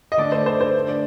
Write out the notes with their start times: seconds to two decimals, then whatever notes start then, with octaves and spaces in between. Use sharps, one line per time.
0.12 D#5
0.17 D3 A3 D4 D5
0.32 C5
0.46 C5
0.61 C5
0.89 D5